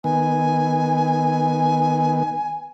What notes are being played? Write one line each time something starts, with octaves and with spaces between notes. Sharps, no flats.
D#3 B3 G#5